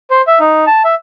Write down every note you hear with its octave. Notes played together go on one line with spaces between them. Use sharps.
C5
E5
D#4
A5
E5